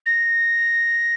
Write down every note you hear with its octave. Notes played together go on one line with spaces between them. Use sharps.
A#6